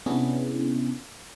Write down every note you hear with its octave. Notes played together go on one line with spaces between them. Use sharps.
C3 B3 C#4 D4 E4 G#4